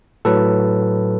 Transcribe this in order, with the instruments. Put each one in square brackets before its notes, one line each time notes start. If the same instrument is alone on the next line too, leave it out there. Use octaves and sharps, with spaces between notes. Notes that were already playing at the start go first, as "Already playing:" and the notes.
[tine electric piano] A2 F#3 A4 B4